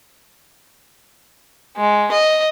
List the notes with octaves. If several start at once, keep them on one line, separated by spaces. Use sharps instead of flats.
G#3
D#5